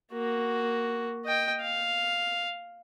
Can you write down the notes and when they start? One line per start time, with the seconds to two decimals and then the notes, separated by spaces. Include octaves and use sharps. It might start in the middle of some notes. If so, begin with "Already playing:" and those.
0.12 A#3 F#4
1.25 D#5 G5
1.62 F5